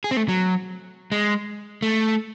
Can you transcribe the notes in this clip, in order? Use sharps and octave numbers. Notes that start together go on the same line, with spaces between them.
G#4
C4
A3
F#3
G#3
A3